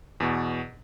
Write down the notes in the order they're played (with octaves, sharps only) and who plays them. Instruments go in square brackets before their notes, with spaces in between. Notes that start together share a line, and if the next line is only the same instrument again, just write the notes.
[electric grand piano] E2 B2